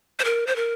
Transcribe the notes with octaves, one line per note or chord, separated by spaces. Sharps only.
C5
A#4
C5
A#4